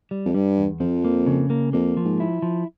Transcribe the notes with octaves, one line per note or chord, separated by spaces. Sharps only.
G3
F2
G2 G3
E2
F2 F3
A#3
C#3
A#3
F2 A#3
F3
G#2
E4
F3